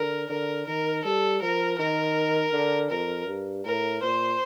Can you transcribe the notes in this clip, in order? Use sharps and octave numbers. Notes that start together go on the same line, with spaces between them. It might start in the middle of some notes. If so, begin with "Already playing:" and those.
Already playing: D3 A#4
D3 A#4
D#3 A#4
G3 A4
F3 A#4
D#3 A#4
D3
F2 A#4
G2
A2 A#4
A#2 C5